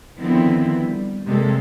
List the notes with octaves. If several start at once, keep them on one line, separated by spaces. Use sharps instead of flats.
D3 D#3 F3 B3 C4 E4
G3
C3 G3 G#3 A#3 A4